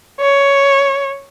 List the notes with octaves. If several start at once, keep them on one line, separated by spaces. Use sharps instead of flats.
C#5